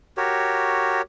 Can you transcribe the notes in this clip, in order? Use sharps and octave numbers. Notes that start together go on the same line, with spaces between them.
F#4 G4 A#4 C#5